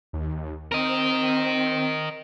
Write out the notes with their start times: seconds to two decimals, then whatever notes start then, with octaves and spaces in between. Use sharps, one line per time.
0.13 D#2
0.72 C4 A#4 D#5